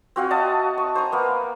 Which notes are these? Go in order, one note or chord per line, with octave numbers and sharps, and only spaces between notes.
C4 F#4 F5 G#5
D#5 E5 F#5 A5
C#6
C5 G#5 A#5
A#3 B3